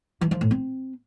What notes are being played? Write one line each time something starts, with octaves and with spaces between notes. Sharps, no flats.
E3
F3
A2
C4